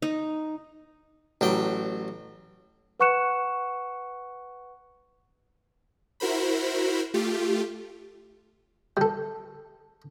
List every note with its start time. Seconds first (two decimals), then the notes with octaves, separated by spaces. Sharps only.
0.02 D#4
1.41 A1 F#3 G5
3.00 B4 F#5 C#6 F#6 C#7 E7
6.20 E4 F#4 A#4 C5 B5
7.14 A3 F4 G4
8.97 G3 A4